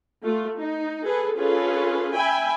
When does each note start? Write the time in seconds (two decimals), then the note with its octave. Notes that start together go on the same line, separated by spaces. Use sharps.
0.24 A3 F4
0.59 D#4
1.05 G#4 A4 B4
1.36 C#4 F4 G#4 A4 B4
2.14 E5 G5 G#5 B5